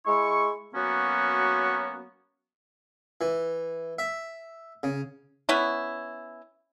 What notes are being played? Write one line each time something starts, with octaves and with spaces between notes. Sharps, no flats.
G#3 E4 C#6
F#3 A#3 B3 C#4 F#4
E3
E5
C#3
B3 C#4 E4